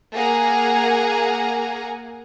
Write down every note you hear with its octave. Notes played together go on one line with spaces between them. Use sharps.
A#3 G#4 F#5 G#5 A#5